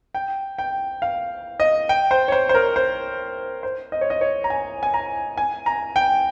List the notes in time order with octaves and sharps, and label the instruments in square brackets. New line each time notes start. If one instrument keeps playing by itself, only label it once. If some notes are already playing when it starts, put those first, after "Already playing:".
[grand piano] G5
G5
F5
D#5
G5
C5
C#5
C5
C5
A#4
C5
C5
D#5
C#5
D#5
C#5
A#5
G#5
G#5
A#5
G#5
A#5
G5